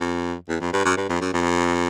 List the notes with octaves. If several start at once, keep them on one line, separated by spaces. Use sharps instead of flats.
F2
E2
F2
G2
F#2
G2
F2
F#2
F2